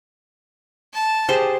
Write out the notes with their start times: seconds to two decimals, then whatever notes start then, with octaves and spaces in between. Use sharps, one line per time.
0.93 A5
1.28 G4 G#4 C5